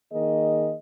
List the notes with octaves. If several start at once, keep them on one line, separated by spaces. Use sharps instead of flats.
D#3 A#3 G#4 D#5